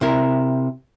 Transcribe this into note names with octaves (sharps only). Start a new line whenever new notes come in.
C3 E4 A#4